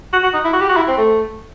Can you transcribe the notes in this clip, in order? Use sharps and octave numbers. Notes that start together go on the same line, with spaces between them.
F#4
F#4
D#4
E4
F#4
G4
F#4
E4
C4
A3